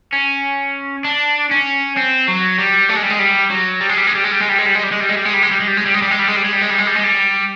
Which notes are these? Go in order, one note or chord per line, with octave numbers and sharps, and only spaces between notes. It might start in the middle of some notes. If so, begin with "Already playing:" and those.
C#4
D4
C#4
C4
F#3
G3
A3
G#3
G3
G#3
G3
F#3
G3
G#3
G3
G#3
G3
G#3
G3
G#3
G3
G#3
G3
G#3
G3
G#3
G3
G#3
G3
G#3
G3
G#3
G3
G#3
G3
G#3
G3
G#3
G3
G#3
G3
G#3
G3
G#3
G3
G#3
G3
G#3
G3
G#3
G3